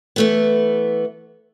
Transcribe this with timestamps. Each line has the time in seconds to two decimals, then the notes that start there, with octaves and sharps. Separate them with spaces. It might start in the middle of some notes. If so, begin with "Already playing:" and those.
0.16 E3 A3 B3